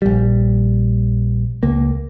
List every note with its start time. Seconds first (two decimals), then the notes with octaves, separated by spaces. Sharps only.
0.02 A#1 G3
1.63 C#2 A#3